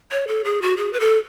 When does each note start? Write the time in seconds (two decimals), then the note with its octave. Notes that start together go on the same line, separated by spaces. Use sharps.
0.11 C#5
0.28 A4
0.44 G#4
0.62 F#4
0.77 G#4
0.93 B4
1.00 A4